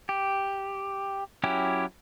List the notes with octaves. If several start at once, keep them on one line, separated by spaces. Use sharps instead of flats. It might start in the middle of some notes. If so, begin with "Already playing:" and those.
G4
F#3 C#4 E4 G4